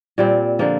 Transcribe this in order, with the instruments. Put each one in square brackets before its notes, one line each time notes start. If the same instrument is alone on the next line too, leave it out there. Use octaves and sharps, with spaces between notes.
[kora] A#2 G3 C4
D3 F3 A#3